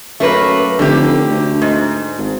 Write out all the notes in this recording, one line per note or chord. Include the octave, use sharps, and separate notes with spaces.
F#2 A3 A#3 B4
F1 D3 G4
D2
G#2
G#1